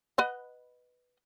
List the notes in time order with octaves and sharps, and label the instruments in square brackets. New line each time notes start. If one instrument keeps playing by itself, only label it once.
[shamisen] B4 D#5 F#5